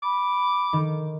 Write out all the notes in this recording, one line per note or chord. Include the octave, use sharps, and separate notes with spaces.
B5 D6
D#3